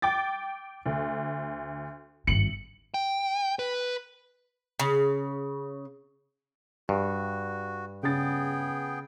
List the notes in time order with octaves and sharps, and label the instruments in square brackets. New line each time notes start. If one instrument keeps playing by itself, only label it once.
[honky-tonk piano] G5 D6 A6
D2
[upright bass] G#1 G2 [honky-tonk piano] C#7 F#7
[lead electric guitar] G5
B4
[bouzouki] C#3
[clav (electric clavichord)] G2 [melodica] F#4
[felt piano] C#3 A6 [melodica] B3 G#4 G5